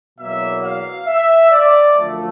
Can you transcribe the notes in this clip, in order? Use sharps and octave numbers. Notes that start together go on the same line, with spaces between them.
E2 B2 F#3 A#3 E5
F5
E5
D5
F#2 D3 F3 A3